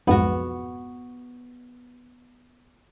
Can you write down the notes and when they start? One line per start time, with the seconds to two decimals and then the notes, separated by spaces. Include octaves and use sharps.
0.07 B1 F2 G#2 B3 F#4